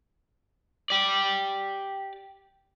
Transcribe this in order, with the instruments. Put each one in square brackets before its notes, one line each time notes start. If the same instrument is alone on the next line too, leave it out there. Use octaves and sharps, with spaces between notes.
[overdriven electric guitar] G4 D5